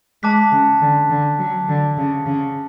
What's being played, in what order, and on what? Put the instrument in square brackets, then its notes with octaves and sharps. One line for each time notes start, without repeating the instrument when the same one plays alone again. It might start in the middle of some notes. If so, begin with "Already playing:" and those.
[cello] G#3 [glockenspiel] A5 D6 F#6 B6
[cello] C#3
D3
D3
F#3
D3
C#3
C#3